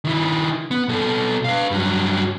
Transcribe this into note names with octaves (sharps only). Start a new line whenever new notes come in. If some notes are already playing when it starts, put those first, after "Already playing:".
D#3 E4
B3
B2 A4
B4 F5
G2 F#3